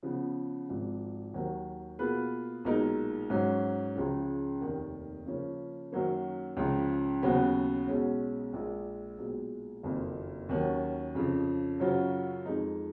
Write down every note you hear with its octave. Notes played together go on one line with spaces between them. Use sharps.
C#3 F3 B3
G#1 G#2 F3
D#2 D#3 F#3
B2 A#3 F4 G#4 B4
B1 A#2 G#3 D#4 A#4
G#2 F#3 C#4
C#2 C#3 F3 G#3
F1 D#2 D#3 A#3
C#3 F3 A#3 C#4
F#2 D#3 F#3 A#3 C#4
C#2 C#3 F3
D#2 C#3 F#3 B3 F#4
B1 B2 G#3 C#4
A#1 A#2 G#3
B1 A#2 G#3
F#1 F2 D#3 A#3
D#2 D#3 F#3 C#4
F2 C#3 F3
F#2 C#3 F#3 C#4 F4
F2 F3 G#3 D#4